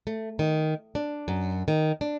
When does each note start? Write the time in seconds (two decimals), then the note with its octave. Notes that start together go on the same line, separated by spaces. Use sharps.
0.07 A3
0.39 D#3
0.95 D4
1.28 F#2
1.68 D#3
2.01 D4